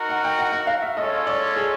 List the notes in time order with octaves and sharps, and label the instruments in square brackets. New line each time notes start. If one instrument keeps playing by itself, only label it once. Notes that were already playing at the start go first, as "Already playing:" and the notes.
Already playing: [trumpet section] D#4 F#4 A#4
[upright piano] F#5
G5
F#5
F#5
F5
E5
[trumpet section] G#3 C#4 F4 A4 C#5 [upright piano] D#5
[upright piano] D5
G#4